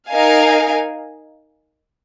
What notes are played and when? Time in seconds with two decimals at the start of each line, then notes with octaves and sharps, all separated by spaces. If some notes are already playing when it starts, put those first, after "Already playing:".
0.10 D#4 A#4 F5 G#5